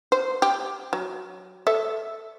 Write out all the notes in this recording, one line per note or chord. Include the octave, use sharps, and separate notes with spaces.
C5
G4
F#3
A4 E5